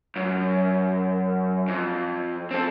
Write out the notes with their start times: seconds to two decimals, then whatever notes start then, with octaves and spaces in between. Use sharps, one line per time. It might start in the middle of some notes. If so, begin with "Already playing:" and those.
0.16 F#2
1.68 F2
2.51 C4 A4